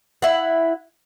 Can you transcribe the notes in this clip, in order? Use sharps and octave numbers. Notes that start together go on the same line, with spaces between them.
E4 F#5